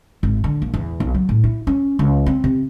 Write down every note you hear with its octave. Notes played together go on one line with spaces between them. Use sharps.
G#1
D3
A#1
E2
B1
F#3
A2
E4
C#4
C#2
C4
C3